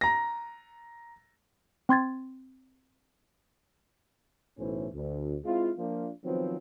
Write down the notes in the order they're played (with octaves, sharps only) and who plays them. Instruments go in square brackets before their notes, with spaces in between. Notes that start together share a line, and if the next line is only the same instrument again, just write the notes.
[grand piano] A#5 A#6
[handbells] C4 C6 G#6 A6
[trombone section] B1 A2 E3 A3 C#4 C5
D2
G#3 C4 E4 F4
F3 A#3 D4 F4
D#3 F3 F#3 B3 C4